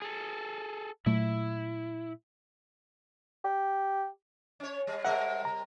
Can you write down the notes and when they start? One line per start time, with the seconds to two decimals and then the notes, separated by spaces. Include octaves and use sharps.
0.02 G#4 A4
1.06 A#2 F#3 A3 E4
3.44 G4
4.60 C#4 C#5
4.87 G3
5.05 G3 C4 A#4 E5 F#5
5.45 A#5